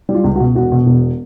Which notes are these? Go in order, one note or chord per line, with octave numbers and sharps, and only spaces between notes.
G3
F4
C#2
F#4
B2
E1 F#4
B2
E1